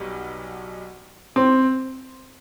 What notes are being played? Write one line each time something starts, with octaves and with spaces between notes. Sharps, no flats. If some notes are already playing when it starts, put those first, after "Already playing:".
Already playing: B1 B2 G3
C4